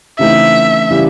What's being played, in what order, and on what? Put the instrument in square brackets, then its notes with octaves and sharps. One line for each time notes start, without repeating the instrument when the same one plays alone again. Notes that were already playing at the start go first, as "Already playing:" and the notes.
[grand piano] C#3 E3 A3 C4 D#4 [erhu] E5
[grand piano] C#3 E3 G3